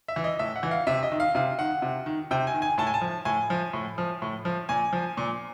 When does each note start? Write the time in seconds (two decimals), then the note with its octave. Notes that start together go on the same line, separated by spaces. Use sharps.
0.08 E5
0.16 E3
0.24 D#5
0.39 A2 E5
0.56 F#5
0.63 E3
0.71 F5
0.87 C3 E5
1.03 D#5
1.11 D#3
1.20 F5
1.35 C3 F5
1.59 D#3 F#5
1.82 C3
2.06 D#3
2.31 C3 G5
2.47 G#5
2.54 D#3
2.62 G#5
2.78 A2 A5
2.87 G#5
2.94 A5
3.01 F3
3.25 A2 G#5
3.50 F3
3.73 A2
3.98 F3
4.22 A2
4.45 F3
4.69 A#2 G#5
4.93 F3
5.17 A#2